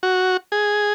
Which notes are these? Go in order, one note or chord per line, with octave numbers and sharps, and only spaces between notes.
F#4
G#4